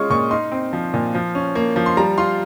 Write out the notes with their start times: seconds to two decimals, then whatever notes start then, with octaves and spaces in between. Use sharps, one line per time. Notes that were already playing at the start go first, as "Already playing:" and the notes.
Already playing: G#3 C#4 F4 C#6 D#6 F6
0.10 A#2 C#6
0.31 D#4 C6
0.52 C4
0.73 F3
0.94 A#2
1.15 F3
1.35 C#4
1.55 A#3
1.76 F3
1.86 C6
1.97 G3 A#5
2.18 F4 C6